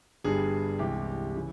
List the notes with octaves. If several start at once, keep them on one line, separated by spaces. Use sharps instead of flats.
G1 G2 G3 G#4
C2 C3 E3 G#3 G4
C#3 E3